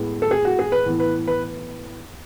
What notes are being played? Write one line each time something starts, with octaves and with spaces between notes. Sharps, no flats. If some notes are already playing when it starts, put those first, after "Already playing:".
Already playing: A2 G#3 B3
A4
G#4
F#4
G#4
B4
A2 E3 B3
B4
B4